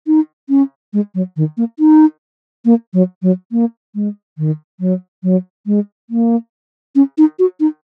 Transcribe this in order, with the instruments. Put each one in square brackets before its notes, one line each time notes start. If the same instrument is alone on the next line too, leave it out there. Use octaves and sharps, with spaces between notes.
[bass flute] D#4
C#4
G#3
F#3
D#3
A#3
D#4
A#3
F#3
F#3
A#3
G#3
D#3
F#3
F#3
G#3
A#3
C#4
D#4
F#4
D#4